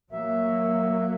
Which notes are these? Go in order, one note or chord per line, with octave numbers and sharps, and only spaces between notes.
F#3 A#3 E5